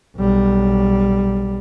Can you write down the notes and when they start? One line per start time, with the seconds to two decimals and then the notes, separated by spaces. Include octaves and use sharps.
0.17 B1 G3